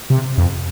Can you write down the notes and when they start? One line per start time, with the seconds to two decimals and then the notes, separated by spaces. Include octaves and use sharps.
0.10 C3
0.38 F2